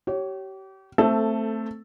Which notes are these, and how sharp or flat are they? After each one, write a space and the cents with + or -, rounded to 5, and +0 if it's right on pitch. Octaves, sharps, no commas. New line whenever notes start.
G4 -35 C#5 +0
A3 +15 C4 +0 A4 +0